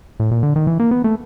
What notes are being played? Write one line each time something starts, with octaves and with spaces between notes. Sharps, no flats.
A2
A#2
D3
D#3
E3
A#3
B3
A3